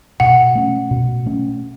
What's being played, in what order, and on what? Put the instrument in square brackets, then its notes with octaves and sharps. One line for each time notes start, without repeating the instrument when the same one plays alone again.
[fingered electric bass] B2 [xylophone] F#5
[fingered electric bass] A3 C#4
B2
A3 C#4